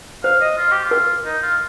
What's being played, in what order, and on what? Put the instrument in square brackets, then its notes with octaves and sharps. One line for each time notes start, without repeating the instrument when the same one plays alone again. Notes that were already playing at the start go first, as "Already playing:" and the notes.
[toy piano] C5 [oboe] F5
[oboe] D#5
F4
G4
F4
[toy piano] A#4
[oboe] D#4
F4